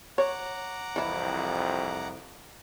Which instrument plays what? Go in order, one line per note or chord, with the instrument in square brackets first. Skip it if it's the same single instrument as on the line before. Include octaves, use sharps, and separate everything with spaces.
[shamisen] C#5 [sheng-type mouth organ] F#5 A#5 D6
[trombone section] C2 F2 [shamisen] E3 E4